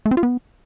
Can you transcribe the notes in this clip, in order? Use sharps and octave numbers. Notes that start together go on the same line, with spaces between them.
A3
C4
F4
B3